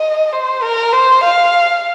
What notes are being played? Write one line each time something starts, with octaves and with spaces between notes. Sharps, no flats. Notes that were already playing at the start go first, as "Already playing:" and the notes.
Already playing: D#5
C5
A#4
C5
F5